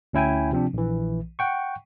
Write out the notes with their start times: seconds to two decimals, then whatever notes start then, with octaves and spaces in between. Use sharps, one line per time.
0.13 D2 C#4 E4 G5 G#5
0.52 C3 F3 C4 D4
0.73 A#1 E3
1.39 F#5 G5 C#6